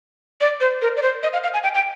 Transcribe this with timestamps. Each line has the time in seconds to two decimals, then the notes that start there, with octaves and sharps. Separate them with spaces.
0.41 D5
0.61 C5
0.82 A#4
0.97 D5
1.02 C5
1.23 D#5
1.33 F5
1.43 F5
1.54 G#5
1.63 G5
1.74 G5